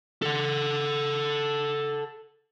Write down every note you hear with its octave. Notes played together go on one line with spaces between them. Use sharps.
A4 F#5